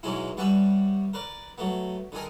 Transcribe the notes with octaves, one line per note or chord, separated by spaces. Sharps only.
G#2 B2 F#3 G#3 C#4 E4
G3 B3 C#4 B4 E5
A#4 B4 D5
F#3 A3 B3
D3 D#3 G#4 A#4